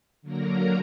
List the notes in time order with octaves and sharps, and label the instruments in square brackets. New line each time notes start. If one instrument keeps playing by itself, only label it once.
[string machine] D3 F#3 A#3 A#4 A#5